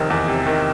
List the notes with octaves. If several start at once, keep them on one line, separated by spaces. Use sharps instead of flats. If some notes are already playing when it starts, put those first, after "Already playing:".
Already playing: F1 D#3
E2
C3
D#3